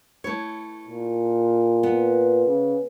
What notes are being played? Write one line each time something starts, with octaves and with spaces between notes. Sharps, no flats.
A3 E4 C#5
A#2
B3
C#3